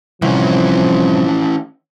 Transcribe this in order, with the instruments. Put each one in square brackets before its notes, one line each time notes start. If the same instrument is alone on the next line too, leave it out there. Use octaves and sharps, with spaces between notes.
[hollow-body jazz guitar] C2 [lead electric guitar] E3 C#4 [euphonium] F3